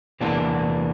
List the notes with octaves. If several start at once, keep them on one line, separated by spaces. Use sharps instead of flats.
E2 C3 E3 A#3 D4